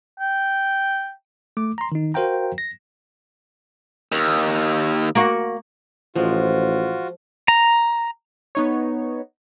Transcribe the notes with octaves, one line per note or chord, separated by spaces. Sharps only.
G5
A3 D6
A#5 C6
D#3 D#4
F#4 A#4 C5 F5 G5 A#5
A#6
D#2
A#3 F#4
A1 F3 G#3 F4 F#4
A#5
B3 D#4 C#5